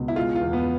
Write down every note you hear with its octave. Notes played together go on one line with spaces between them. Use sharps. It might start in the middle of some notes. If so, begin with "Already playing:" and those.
Already playing: C#2 B2
E4
G#3 F4
F4
E2
B3